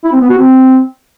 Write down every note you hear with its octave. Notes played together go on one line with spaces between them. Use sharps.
E4
C4
B3
F#4
C4